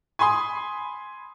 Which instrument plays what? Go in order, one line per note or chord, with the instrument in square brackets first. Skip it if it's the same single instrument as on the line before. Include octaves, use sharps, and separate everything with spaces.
[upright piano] G#5 B5 C6 D#6